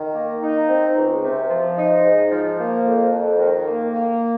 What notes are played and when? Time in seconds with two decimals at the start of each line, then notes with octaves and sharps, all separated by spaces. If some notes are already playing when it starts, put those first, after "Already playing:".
Already playing: D#3
0.14 A#3
0.41 D#4
0.68 C4
0.96 C#2
1.22 C3
1.49 F3
1.77 D#4
2.04 G#2
2.31 F3
2.59 A#3
2.85 F2
3.12 F2
3.39 D#3
3.67 A#3
3.94 A#3